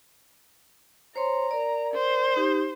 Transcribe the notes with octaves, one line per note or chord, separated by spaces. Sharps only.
C5 C#5 A#5 C6
A#4 D5
C5
D#4 G4